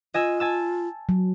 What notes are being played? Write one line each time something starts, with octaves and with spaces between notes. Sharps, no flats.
F4 D#5 G#5 E6
G#5 A5 E6
F#3